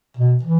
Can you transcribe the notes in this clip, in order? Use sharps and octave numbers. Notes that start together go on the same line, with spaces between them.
B2
E3